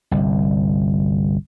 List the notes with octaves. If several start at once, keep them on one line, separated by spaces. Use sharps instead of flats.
G1 C2